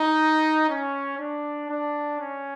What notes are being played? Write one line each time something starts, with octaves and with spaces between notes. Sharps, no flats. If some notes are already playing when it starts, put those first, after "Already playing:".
Already playing: D#4
C#4
D4
D4
C#4